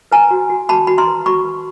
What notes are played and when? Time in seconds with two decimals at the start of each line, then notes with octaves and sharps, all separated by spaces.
0.12 B4 G#5 A#5
0.31 F#4
0.49 F#4
0.69 F#4 A5 B5
0.87 F#4 B5
0.98 A#5 C6
1.07 B4
1.26 F#4 B5 C#6
1.45 B4